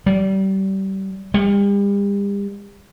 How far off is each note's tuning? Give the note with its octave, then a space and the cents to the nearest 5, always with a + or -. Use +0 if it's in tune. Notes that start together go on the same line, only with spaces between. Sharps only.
G3 -30
G3 +40